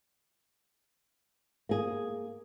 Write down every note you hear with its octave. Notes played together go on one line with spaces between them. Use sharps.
A#3 G#4